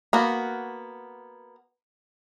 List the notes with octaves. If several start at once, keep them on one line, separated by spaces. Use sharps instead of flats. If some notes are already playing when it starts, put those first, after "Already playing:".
A#3 B3 F#4